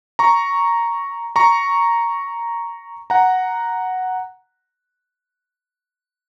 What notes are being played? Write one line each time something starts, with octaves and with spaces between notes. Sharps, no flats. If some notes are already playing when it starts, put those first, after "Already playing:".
A#5 C#6
A#5 C#6
F#5 A#5